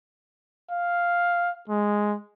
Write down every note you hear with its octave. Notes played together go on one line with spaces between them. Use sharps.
F5
G#3